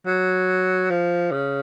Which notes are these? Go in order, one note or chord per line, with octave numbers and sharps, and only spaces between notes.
F#3
F3
C#3